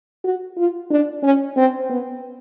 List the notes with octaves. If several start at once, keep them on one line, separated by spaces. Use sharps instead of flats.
F#4
F4
D4
C#4
C4
B3